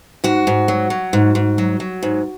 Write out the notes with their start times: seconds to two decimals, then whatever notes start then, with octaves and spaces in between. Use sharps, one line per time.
0.24 G#2 F#4
0.47 G#2
0.68 F#3
0.90 F#3
1.13 G#2
1.35 G#2
1.58 F#3
1.80 F#3
2.03 G#2